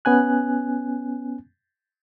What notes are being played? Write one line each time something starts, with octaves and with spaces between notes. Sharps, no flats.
B3 C#4 G#5 F#6